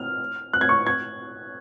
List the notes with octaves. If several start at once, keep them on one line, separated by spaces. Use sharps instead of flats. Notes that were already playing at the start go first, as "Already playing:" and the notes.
Already playing: F6
F#6
G#6
C#6
G#6